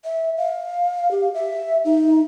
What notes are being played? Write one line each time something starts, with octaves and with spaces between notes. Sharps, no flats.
E5
F5
G4
E5
D#4